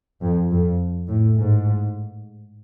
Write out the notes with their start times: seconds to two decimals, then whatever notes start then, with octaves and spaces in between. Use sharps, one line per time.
0.21 F2
0.51 F2
1.07 A2
1.36 G#2